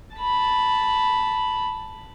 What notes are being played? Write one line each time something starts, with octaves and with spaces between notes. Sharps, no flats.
A5 B5